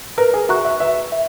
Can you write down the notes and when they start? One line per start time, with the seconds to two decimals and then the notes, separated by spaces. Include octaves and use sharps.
0.18 A#4 B4
0.34 G#4
0.49 F#4 E5 A#5 C#6 F#6
0.65 E5
0.80 B4 E5
1.12 E5